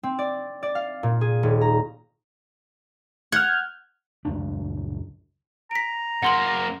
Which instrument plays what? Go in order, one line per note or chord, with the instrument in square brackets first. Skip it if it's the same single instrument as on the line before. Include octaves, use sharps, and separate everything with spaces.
[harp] C4
D5
D5
F5
A#2
G#4
D#1
A#5
[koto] F#5 [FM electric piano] F6 G6 G#6
[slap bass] C#2 F#2 F3 D4
[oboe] A#5 [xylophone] B6 D7
[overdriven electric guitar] F#2 A#3 [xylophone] F#5 C6 F#7